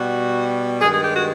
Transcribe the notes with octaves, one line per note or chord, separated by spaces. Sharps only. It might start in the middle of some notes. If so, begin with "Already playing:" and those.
Already playing: B2 G3 F#4
G2 D#3 G#3 G#4
G#4
G4
F#4